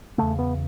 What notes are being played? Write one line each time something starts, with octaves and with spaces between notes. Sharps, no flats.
E2 C#3 A3
B3